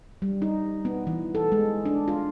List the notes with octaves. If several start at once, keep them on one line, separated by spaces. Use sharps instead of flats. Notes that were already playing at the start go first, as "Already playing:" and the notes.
G3
D#4
B3
E3
A4
G#3
D4
F4